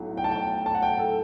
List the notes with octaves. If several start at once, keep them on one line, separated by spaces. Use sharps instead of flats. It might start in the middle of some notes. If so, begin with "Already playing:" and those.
Already playing: B1 A2 F#3
G5
A5
G5
A5
F#5
G5
A4